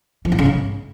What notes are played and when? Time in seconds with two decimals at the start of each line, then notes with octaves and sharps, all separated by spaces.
0.25 F3
0.32 G#2
0.39 C#3
0.45 G#2